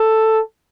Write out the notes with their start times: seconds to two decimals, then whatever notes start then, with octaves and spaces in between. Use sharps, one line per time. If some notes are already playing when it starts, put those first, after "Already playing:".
Already playing: A4